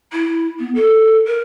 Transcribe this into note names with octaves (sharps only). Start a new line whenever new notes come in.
E4
B3
A4
A#4